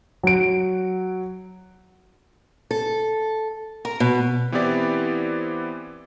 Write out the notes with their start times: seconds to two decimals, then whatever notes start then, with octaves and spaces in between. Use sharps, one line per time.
0.23 F#3 D7
2.71 A4
3.85 A#4
4.00 B2
4.52 E3 B3 C4 E4 G4 D5